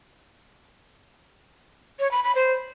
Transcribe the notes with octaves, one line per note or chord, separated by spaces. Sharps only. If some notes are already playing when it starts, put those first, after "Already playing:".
C#5
B5
B5
C5